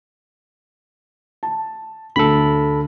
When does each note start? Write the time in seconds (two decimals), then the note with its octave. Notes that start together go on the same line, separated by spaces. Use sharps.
1.43 A5
2.16 D2 A4 B5